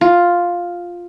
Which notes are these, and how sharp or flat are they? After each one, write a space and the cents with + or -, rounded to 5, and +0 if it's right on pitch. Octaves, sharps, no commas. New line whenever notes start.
F4 +5